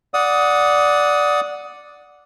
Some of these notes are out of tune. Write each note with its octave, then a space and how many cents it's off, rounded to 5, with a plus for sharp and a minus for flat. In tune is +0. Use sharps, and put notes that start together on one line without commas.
D5 +0 F#5 -10 D#6 +20